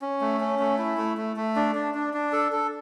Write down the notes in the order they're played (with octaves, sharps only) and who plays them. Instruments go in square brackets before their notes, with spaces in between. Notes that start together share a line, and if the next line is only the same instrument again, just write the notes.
[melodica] C#4
A3
C#4
A3
E4
A3
A3
A3
D4
D4
D4
D4
A4
A4